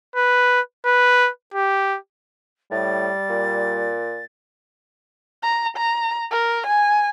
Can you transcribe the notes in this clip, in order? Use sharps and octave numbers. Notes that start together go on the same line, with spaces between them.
B4
B4
G4
A2 G3 A6
A#2
A#5
A#5
A#4
G#5